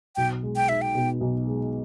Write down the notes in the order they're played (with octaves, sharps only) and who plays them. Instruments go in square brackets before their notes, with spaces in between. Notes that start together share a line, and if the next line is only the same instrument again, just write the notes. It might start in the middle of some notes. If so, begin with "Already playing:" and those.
[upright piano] B1 [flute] G5
[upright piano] G#3
[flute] G5
[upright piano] D#4 [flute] E5
[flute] G5
[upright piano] B2
B1
G#3